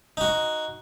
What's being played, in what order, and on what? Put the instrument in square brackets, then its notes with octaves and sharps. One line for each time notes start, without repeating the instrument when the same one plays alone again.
[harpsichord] D#4 F#4